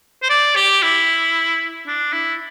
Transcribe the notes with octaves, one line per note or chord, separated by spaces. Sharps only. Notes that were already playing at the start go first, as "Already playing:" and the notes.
C5
D5
G4
E4
D4
E4